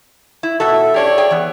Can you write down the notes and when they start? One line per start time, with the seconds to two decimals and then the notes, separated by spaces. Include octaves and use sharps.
0.43 E4
0.60 B2 F#4 A4 E5
0.94 C#4 D4 G4 C#5 D5
1.18 G#4 G5
1.31 E3 B3